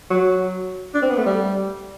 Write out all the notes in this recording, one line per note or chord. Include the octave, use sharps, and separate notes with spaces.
F#3
D4
C4
B3
A3
G3